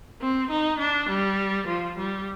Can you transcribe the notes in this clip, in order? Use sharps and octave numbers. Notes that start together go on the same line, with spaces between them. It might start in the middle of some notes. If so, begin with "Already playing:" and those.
C4
D#4
D4
G3
F3
G3